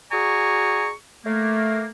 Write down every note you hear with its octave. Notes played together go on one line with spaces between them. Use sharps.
F#4 G#4 D5 G#5 A#5 C#6
A3 A#3